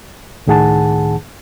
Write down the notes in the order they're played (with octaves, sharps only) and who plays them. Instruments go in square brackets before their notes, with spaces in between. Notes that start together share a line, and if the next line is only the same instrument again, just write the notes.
[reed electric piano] C#2 A2 D#3 G#4 F#5 A5